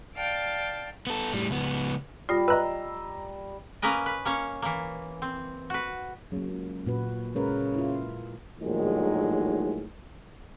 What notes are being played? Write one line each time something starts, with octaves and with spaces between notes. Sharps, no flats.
D5 F5 G5 A5
B3 A4
A2 G3
C#2 B3
G3 F4 D#6 A#6 C7
B4 D#5 A#5 E6 F#6
A#3 C#4 A#4 B4 D#5
B4
A#3 C#4 C#5
E3 A#3
C4
F#4 B4
C#3 F#3 A#3
C#2
A#2 F#4 B4
C#3 G#3 A#4 B4
E4 F4
A#1 D#2 A2 D#3 F#3 G#3